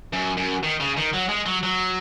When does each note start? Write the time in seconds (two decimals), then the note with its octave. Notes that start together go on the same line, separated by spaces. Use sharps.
0.13 F#2
0.37 F#2
0.63 D#3
0.80 C#3
0.97 D#3
1.13 F#3
1.29 G#3
1.46 F#3
1.63 F#3